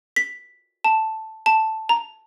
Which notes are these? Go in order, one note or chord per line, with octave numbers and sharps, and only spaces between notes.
B6
A5
A5
A#5